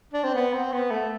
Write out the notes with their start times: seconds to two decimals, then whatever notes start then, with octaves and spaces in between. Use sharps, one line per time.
0.14 D4
0.23 C4
0.35 B3
0.53 C4
0.72 B3
0.91 A3